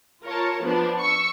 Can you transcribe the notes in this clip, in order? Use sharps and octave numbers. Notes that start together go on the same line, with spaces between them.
F4 A#4 C#5 A5
F3 B3 D4
C#6 E6